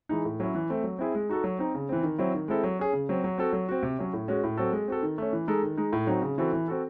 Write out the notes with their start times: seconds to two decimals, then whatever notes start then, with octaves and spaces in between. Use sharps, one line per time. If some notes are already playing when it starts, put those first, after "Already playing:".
0.09 E3 G#3 D#4
0.25 A2
0.40 F#3 C#4 E4
0.55 E3
0.70 A3 C4
0.84 F#3
0.99 C4 E4 G#4
1.15 G#3
1.29 D#4 F#4 A4
1.44 F#3
1.59 C4 D#4
1.75 C#3
1.89 E3 C4
2.03 D#3
2.19 F#3 C4 E4
2.34 D#3
2.48 G#3 C4 E4 A4
2.64 F#3
2.79 C#4 G#4
2.93 C#3
3.09 F#3 C4
3.24 F#3
3.38 C4 F#4 A4
3.53 F#3
3.69 C4 F#4
3.83 C3
3.99 F#3 C#4
4.13 A2
4.28 G#3 C#4 F#4
4.44 A2
4.57 F#3 C4 F#4 A4
4.72 G#3
4.88 C4 F#4 A4
5.03 D#3
5.18 A3 C#4
5.33 E3
5.48 G#3 D#4 A4
5.63 D#3
5.77 G#3 D#4
5.93 A2
6.07 F#3 C4 D#4 F#4
6.22 C#3
6.38 E3 C4 F#4 A4
6.53 E3
6.68 C4 F#4 A4